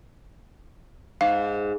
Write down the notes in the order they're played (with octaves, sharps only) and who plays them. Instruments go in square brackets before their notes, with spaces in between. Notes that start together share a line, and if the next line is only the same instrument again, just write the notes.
[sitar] G#2 [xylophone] F5